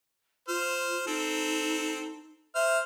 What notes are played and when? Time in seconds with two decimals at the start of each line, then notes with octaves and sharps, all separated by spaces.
0.48 F4 C5 F6
1.07 C4 D#4 A4
2.55 C5 E5 F6